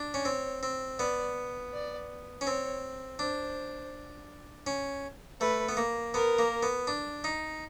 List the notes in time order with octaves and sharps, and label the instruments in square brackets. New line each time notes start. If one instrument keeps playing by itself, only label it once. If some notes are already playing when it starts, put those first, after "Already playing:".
Already playing: [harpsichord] D4
C#4
[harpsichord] C4 [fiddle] C#5
[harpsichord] C4
[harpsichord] B3 [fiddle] D5
[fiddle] D5
[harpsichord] C#4
[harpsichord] C4 [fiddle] C#5
[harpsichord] D4 [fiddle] C5
[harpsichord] C#4
[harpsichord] A3 [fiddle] B4
[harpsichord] B3
A#3
[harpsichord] B3 [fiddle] A#4
[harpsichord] A#3
B3
D4
D#4